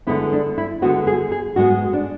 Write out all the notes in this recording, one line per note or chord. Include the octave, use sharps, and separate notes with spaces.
D2 D3 G#3 B3 E4
D4
E4
D2 D3 G#3 B3 F#4
G#4
G#4
G#2 G#3 B3 F#4
D4